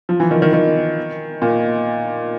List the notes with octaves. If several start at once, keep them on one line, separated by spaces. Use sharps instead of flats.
F3
E3
D#3
D#3
D#3
A#2